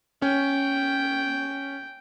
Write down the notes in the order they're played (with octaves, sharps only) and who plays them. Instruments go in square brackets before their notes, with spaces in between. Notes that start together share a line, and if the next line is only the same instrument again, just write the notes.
[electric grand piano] C#4 [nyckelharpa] G5